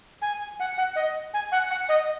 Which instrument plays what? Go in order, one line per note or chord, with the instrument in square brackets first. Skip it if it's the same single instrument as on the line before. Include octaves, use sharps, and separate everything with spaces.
[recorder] G#5
F#5
F#5
D#5
G#5
F#5
F#5
D#5